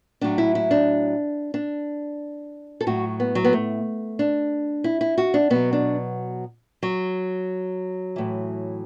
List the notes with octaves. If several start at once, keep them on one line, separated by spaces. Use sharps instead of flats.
A2 F#3 D4
E4
E4
D4
D4
A4
A2 F#3 F#4
B3
F#3
B3
A3
D4
E4
E4
F#4
D4
B2 F#3 B3
D4
F#3
A2 E3